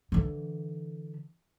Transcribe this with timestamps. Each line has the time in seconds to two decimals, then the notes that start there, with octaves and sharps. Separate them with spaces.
0.12 D3 E3